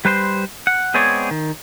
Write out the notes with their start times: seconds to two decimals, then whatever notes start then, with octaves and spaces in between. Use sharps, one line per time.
0.05 G3 B4 C5 C6
0.67 F#5
0.94 G#3 B3 C4 G#4 C#5 D5
1.31 D#3